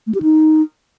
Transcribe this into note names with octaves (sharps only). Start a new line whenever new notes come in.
A3
G4
D#4